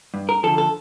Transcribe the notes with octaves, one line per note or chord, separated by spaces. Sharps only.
G2
A#4
D3 F3 A4
A4